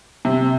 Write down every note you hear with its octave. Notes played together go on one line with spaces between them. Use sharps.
C3